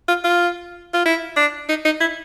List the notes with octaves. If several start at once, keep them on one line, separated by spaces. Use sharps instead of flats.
F4
F4
F4
E4
D4
D#4
D#4
E4